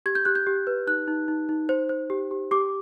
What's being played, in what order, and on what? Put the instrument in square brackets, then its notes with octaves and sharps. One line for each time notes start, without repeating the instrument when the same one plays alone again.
[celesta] G4 G#6
G6
G4 F#6
G6
G4
B4
D#4 F#6
D#4
D#4
D#4
C5
C5
G4
G4
G4 D6